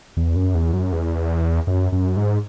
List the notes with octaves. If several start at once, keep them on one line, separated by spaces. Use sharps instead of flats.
E2
F#2
E2
F#2
E2
F#2
F#2
G#2